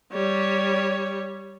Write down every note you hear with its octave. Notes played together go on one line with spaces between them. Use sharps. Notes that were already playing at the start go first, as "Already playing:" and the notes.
G3 C#5